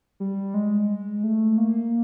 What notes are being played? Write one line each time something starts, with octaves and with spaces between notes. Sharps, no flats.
G3
G#3
A3
A#3